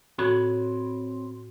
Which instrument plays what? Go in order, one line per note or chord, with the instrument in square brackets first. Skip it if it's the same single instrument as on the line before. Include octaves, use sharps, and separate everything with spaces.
[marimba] A2 F#4 [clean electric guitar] C4 C#5 B5